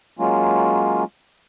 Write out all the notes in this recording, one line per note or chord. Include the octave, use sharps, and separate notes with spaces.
F#3 G#3 A#3 C#4 F4